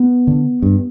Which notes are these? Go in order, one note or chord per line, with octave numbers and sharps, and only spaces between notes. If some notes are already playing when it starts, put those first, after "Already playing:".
Already playing: B3
D3
G2